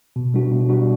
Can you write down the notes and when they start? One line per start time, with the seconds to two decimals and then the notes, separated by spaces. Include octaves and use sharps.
0.16 B2
0.34 G3 D4 F#4
0.52 B2
0.69 G3 D4 F#4